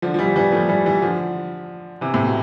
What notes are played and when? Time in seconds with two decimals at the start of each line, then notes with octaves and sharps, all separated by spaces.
0.02 D3 F3
0.14 F3
0.19 E3 G3
0.36 E3 G3
0.52 F3 A3
0.69 E3 G3
0.86 E3 G3
1.02 D3 F3
2.01 C3 E3
2.14 A2 C3
2.27 B2